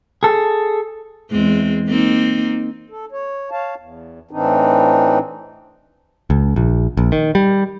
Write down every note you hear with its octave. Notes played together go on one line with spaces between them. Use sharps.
G#4 A4
E2 G#3 C4
A#3 C4 D#4
A4
C#5
C#5 F5 A5
E2
A2 E3 C4 D4 D#4
C#2
A#1
A#1
D#3
G3